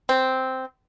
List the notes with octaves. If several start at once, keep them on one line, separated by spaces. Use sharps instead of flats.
C4